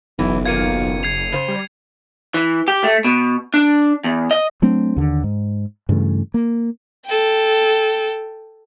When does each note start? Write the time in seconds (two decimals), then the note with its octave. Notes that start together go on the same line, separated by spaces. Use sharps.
0.19 F#1 B1 E3
0.45 D#3 A#3 F4 G#6 C#7 D#7
1.03 G#6 C7 F7
1.32 C#3 C5
1.48 G3
2.34 E3
2.68 G4
2.84 A3
3.04 B2
3.54 D4
4.04 E2
4.31 D#5
4.62 F#3 A3 C4 D4
4.96 D#2 D3
5.24 G#2
5.89 G2 C#3 E3 A3
6.34 A#3
7.06 A4 G5